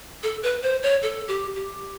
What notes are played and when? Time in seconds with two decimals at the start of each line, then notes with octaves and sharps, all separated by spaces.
0.23 A4
0.43 B4
0.62 C5
0.83 C#5
1.02 A4
1.28 G4
1.55 G4